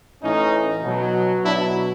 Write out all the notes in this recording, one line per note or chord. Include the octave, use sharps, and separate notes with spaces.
A2 E3 C#4 D#4
B2 F#3
B2 F#3 D4 E4